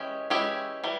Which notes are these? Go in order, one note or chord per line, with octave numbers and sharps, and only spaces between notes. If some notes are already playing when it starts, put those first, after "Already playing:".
Already playing: E3 G#3 C#4 G4
E3 G#3 C#4 E4 G4
E3 G3